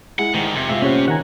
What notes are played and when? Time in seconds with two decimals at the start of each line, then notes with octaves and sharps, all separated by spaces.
0.19 G#3 E4 F#5
0.34 D2 G#2 D#3
0.55 F2 C3 G#6
0.69 G#2 F4 E5
0.82 A#2 G3 A3 C4 C#4 C#5 F#5
1.08 D#3 F#5 G#5 A#5